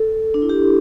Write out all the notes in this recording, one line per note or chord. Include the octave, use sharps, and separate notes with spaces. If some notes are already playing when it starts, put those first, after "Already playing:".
Already playing: A4
D4
E4
G4